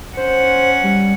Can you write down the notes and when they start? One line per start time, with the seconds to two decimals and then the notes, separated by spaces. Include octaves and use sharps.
0.17 C#4 C5 F#5
0.83 G3